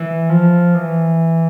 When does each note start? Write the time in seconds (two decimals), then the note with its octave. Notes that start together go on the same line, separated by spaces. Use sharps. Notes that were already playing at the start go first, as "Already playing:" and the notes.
Already playing: E3
0.29 F3
0.75 E3